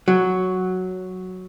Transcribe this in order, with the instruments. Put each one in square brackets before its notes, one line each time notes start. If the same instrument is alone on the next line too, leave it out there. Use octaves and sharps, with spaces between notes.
[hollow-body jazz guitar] F#3